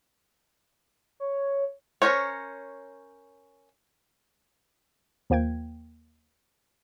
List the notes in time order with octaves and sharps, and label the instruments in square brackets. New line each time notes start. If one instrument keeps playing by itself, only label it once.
[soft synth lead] C#5
[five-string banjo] C#4 D#4 A#4 C5 C#5
[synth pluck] D#2 F3 A#3 G5 G#6